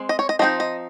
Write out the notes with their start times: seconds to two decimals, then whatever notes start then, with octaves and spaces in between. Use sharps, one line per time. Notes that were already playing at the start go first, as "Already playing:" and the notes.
Already playing: G#3 C4
0.09 D#5
0.19 C#5
0.29 D#5
0.39 F3 C4 D#4 D#5
0.60 D#5